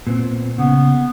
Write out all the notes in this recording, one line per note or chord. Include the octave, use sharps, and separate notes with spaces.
A#2 B3 C4
C#3 B3